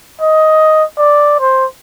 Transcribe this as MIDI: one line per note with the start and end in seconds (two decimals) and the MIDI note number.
0.21 0.84 75
0.98 1.35 74
1.40 1.66 72